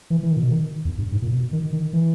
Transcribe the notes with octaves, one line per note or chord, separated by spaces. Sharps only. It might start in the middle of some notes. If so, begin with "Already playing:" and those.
E3
E3
D#3
A#2
B2
D#3
E2
G2
G#2
A#2
B2
D#3
D#3
E3